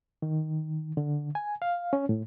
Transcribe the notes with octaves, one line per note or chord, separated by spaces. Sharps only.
D#3
D3
G#5
F5
C#4
A2